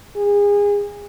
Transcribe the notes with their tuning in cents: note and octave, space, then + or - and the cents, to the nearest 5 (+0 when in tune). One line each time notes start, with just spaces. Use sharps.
G#4 -30